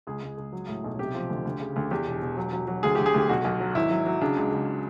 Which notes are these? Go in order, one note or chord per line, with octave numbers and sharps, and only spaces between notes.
C#2 G#4
C#2
C#2
F#3
A2
B1
C3 G4
F3
D2
D2
C#3
D2
E2 G4
E1
E1
F#3
F#3
F#3
D2 G#4
D2 G4
G#4
D2 G4
B1 F#4
B1
F#3
G#1 E4
F#3
F#3
C#3 D4
C#2
C#2